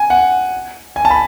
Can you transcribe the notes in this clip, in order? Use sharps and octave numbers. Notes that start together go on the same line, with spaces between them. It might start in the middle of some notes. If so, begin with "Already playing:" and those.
Already playing: G#5
F#5
G#5
A5
B5